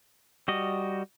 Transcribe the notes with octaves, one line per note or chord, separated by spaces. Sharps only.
G3 F#4 D#5